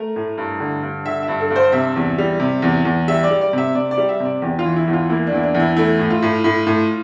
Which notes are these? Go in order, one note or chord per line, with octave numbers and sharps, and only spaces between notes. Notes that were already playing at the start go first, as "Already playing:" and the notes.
Already playing: A3 A#4
A2
G2
D3
G2
D3 E5
E5
G2
A4
G2
C5
C3 E5
E2
G3
C3
E2
E2
G3 E5
D5
G3
D5
C3 E5
C3 D5
D5
G3
E5
C3
D5
E2 G4
F4
E3
E4
E2
F4
A#3 E4
D4
E2 E4
D4
E2
E4
A3 E4
A2
F4
A2
A2
A2